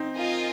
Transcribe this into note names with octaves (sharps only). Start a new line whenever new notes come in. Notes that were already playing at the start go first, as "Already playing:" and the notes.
Already playing: C4 D#4
F4 A#4 D#5 G#5